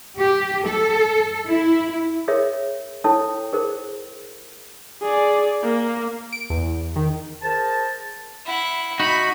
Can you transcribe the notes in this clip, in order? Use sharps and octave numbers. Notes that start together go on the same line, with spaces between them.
G4
A4
E4
G#4 A#4 C#5 E5
E4 A4 C#5 G5 A5
G#4 A#4 C5
G#4 D5
A#3
D7
E2
D#3
G#4 A#4 C5 A5
E4 F#5
D#4 F#4 B5